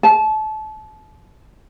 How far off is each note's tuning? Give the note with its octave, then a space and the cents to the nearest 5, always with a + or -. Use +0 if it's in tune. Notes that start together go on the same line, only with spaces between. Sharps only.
A5 -30